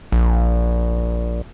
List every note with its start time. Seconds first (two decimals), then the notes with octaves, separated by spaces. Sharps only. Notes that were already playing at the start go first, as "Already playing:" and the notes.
0.12 A#1